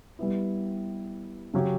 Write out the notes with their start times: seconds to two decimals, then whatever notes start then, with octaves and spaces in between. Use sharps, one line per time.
0.19 G3 B3 E4
1.54 C#3 F#3 C#4 G4